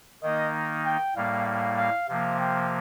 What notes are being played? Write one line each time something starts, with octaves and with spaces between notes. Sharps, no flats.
D#3 A#3 D#4 D#5
G5
A2 G3 A#3 F5
F5
F5
C3 F3 A#3 F5
G5